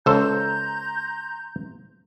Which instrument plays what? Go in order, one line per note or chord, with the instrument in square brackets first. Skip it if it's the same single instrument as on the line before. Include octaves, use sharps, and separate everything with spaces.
[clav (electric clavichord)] C#2 A4 C5 [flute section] A#5 C6 G6